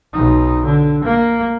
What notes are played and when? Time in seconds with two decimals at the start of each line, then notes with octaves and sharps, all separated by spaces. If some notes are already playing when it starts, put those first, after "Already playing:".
0.13 B1 D#4
0.65 D3
1.04 A#3